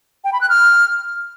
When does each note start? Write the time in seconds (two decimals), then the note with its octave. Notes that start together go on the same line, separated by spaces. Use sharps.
0.24 G5
0.33 B5
0.41 F#6
0.49 F6